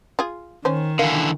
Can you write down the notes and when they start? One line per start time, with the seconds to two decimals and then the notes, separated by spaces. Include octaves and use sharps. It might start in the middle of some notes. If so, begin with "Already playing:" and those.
0.19 F4 G#4
0.65 D#3 C#4 C5
0.99 D3 E3 A#4 F5